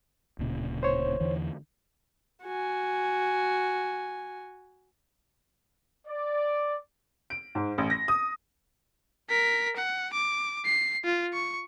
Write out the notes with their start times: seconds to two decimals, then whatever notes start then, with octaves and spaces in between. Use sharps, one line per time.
0.39 D1 A#2 C#3
0.83 C5 C#5
1.20 E2 D3 E3
2.44 F#4 G#5
6.07 D5
7.30 D7
7.55 G#2
7.78 A1
7.90 A#6
8.08 D#6
9.29 A#4 B6
9.76 F#5
10.13 D6
10.65 C7
11.04 F4
11.33 C#6